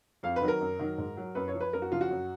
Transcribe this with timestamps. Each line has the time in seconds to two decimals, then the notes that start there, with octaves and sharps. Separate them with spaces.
0.23 F2 F5
0.36 B4
0.41 D#3 F#3
0.48 A#4
0.61 F#2
0.79 D#3 F#3
0.98 G#2
1.17 F#3
1.35 F#2 B4
1.48 C#5
1.54 F3
1.60 B4
1.73 F#2 A#4
1.82 F#4
1.91 C#3 F3 F4
2.01 F#4
2.11 F#2